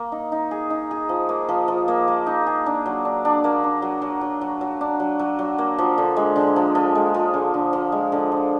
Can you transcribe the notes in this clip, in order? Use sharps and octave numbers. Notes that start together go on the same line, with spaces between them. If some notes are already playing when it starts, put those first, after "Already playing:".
Already playing: A#3
D#4
D#4
G#4
D#4
G#4
F3
A#3
F3
F3
A#3
A#3
D#4
G#4
D4
F#3
D4
D4
A#3
D4
F#3
F#3
F#3
F#3
F#3
D4
F#3
F#3
F#3
A#3
F3
D3
G#3
D3
F3
F3
G#3
F3
D3
D3
F3
G#3
D3
F3